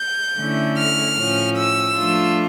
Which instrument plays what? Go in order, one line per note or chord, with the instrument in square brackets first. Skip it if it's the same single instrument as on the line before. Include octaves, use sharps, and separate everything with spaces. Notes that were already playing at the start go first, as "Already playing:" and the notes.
Already playing: [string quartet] G6
D3 A3 C#4 E4
F6
A2 F3 C#4
E6
F3 A3 D4 F4